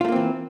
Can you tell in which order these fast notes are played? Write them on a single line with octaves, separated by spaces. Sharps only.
F4 A3 A#3 C4 E3